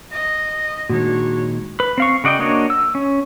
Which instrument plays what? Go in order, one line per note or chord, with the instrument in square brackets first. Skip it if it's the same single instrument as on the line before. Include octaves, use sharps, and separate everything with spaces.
[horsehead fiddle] D#5
[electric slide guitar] A#2 D#3 G#3 [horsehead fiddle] D4 C#5 [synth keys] F#4
[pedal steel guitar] B4
C4 F5 C#6
C#3 F#4 D5 D#5 G5
A#3 D4 F#4 C#5 D#5
E6
C#4